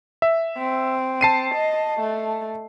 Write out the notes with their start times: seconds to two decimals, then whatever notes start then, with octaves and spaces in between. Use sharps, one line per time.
0.22 E5
0.58 C4
1.21 A5 C7 D#7
1.55 D#5
2.00 A3